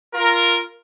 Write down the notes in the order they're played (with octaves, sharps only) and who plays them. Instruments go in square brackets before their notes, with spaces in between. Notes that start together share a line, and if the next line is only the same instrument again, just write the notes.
[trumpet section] F4 A#4